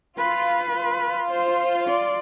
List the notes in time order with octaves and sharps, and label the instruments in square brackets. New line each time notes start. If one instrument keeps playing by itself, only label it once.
[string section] F4 [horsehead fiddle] B4
[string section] F4
[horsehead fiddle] C5
D5